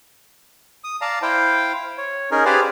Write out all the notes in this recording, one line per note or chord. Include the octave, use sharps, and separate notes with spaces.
D#6
D5 F5 A5 A#5
E4 C5 F5 G5
C#5
C#4 D#4 G#4 A#4
G4 G#4 B4 C5 D5 F5